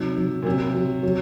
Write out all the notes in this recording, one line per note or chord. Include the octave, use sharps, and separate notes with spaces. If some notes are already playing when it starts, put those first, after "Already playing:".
Already playing: C3 F#3 D#4
F#3
A#2
C3 F#3
F#3
F#3